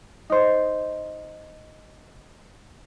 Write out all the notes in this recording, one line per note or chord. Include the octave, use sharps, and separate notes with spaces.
D#4 C5